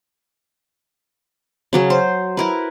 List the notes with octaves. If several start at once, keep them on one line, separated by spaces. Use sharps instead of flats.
C#3 F#3 C#4
C5
E4 A#4 B4